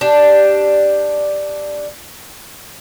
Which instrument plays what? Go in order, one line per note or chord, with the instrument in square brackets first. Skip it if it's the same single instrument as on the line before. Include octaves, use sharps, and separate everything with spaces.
[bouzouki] D4 G4